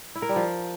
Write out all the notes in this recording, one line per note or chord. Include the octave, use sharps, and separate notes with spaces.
E4
A#4
G3
F3